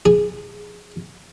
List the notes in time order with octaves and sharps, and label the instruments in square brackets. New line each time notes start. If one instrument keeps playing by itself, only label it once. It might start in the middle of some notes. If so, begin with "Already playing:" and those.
[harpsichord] G#4